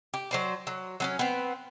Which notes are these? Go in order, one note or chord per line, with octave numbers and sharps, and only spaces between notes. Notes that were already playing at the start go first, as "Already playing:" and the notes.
G4
F#3 C5 D5
F#3
F#3 B3 C#4
B3 C4